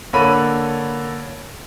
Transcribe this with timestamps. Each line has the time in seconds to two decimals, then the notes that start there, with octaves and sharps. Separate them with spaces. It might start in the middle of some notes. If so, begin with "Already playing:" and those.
0.13 D3 A#3 A4 C#5 B5 D#7